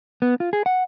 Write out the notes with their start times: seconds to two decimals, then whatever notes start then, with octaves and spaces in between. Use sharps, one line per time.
0.22 B3
0.40 F4
0.53 G#4
0.66 F#5